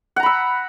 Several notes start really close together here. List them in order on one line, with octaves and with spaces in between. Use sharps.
F#5 A#5 B5 E6